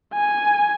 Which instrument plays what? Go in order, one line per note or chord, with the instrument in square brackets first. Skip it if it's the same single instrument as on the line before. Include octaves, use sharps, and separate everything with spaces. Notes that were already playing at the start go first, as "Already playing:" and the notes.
[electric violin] G#5